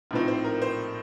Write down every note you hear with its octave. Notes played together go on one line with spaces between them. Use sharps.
A#1 A2 F3 C4 D#4
C5
A#4
C5